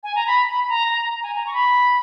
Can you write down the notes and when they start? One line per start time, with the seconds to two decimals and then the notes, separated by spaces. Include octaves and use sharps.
0.03 G#5
0.15 A#5
0.27 B5
0.48 B5
0.64 B5
0.69 A#5
0.90 A#5
1.11 A#5
1.23 G#5
1.34 A#5
1.47 C#6
1.54 B5